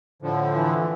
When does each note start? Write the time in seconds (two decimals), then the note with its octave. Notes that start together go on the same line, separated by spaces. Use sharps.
0.22 A2 D3 F3
0.55 E3